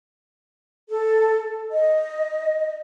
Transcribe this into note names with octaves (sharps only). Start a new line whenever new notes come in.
A4
D#5